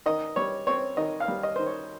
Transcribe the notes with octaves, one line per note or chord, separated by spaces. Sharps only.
D#3 D#5
G3 C#5
C4 C#5
D#3 D#5
F5
G3
D#5
D#3 C5
C#5